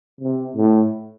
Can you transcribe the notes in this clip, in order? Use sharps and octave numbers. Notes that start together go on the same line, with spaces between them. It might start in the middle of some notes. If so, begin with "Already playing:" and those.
C3
A2